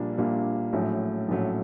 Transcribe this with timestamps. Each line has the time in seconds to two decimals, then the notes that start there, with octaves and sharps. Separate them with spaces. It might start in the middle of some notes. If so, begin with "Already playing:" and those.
Already playing: A#1 A#2 G3 A#3 D4
0.18 A#1 A#2 G3 A#3 D4
0.73 A#1 A2 F#3 A3 C#4
1.28 A#1 A2 F#3 A3 C#4